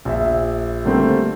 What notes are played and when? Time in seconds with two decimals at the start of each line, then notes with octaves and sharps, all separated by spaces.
0.05 A#1 E5
0.85 D3 G3 A3 A#3 C4